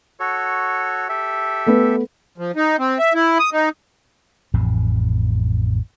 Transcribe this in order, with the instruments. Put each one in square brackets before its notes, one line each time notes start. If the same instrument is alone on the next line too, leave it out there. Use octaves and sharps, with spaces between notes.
[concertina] F#4 A4 C#5
G4 A4 E5
[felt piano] A3 B3 B4
[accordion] F3
D#4
C4
E5
E4
D#6
D#4
[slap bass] A1 F2 A2 C3